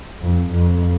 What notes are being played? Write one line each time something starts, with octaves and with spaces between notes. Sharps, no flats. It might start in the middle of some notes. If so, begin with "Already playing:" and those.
F2
F2